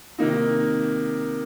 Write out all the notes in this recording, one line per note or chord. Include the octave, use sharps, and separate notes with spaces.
C3 D#3 A#3 D#4